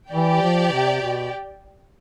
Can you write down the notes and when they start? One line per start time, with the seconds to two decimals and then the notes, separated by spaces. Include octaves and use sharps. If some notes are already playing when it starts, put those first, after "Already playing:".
0.12 E3 G4 D5 G5
0.42 F3
0.72 C3
1.02 B2